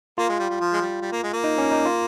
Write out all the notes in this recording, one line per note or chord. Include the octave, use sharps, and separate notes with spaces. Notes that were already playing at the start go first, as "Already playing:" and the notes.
A#3 F4
G#3
G3
G3
F3
G#3
G3
G3
A#3
G#3
A#3
D#4
C#4
D#4
F4